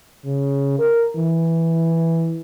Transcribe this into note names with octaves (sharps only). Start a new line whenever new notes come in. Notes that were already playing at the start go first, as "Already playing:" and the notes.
C#3
A#4
E3